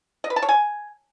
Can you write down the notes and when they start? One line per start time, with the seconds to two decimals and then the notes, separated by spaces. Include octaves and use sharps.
0.24 D#5
0.30 B4
0.36 A5
0.42 C#5
0.49 G#5